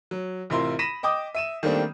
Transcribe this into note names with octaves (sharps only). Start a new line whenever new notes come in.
F#3
A1 C3 E4 F4 A#4 C6
B5 A#6 B6 D#7 E7
D#5 G5 D6 D#6
E5 D#7 E7
D#3 G3 A3 A#3 C4 D4